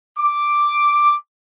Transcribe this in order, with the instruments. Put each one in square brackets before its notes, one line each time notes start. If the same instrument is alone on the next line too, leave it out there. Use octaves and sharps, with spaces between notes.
[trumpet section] D6